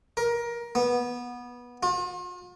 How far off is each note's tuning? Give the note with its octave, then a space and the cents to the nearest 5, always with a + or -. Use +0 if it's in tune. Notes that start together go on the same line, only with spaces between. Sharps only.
A#4 +20
B3 -20
F4 +45